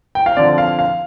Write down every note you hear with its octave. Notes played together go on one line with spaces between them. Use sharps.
G5
F5
D3 F3 C4 D5
F5
F5